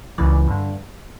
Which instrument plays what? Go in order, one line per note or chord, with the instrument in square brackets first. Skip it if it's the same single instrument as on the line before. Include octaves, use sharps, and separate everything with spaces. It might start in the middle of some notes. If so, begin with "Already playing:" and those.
[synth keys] C#2 C#3 E3 D5
G2 D3